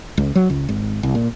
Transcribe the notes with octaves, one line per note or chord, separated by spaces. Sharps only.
C#2
F#3
C#2
G#1
C2
A#2